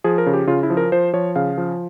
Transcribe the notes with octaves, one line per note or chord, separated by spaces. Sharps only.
F3 G#4
A#4
C#3
G4
C#3 F4
E4
F3
A#4
F3 C5
F3 C#5
C#3 F5
F3